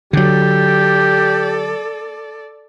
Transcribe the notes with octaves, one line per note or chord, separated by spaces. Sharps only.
D3 F#3 G4 A4 D5